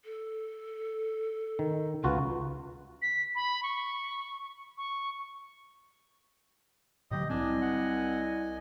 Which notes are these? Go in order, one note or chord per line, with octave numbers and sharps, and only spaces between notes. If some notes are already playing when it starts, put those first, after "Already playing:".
A4
D#3
C#2 F4 F#4 B4
B6
B5
C#6
C#6
A2 D3 F#3 G4 D#5
C2 C4 D4 D#5 G#5
F#5